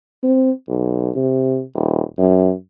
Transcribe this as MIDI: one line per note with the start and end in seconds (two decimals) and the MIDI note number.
0.23 0.52 60
0.68 1.10 35
1.15 1.61 48
1.75 2.01 27
2.18 2.52 42